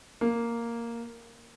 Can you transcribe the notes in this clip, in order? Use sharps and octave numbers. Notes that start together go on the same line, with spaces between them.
A#3